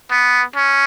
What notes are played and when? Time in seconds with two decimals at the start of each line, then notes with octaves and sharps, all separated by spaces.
0.11 B3
0.56 C#4